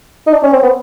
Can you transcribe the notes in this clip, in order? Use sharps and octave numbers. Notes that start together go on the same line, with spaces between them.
D#4
D4
C#4
C4
B3